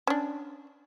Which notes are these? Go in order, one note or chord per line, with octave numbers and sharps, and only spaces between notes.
C#4 D4